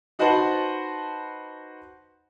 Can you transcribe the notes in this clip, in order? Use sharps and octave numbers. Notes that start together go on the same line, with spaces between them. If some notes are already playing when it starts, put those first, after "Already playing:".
D#4 F#4 B4 C5 F#5 A5